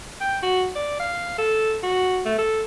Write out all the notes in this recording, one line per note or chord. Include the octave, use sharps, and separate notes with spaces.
G5
F#4
D5
F5
A4
F#4
A3
A4